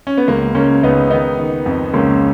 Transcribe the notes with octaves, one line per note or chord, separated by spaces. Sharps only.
C#4
B3
C#2 A#3
C#2 A#3 C#4
C#2 B3 D#4
D#3 B3 D#4
D#3
F2
C#2 A#3 C#4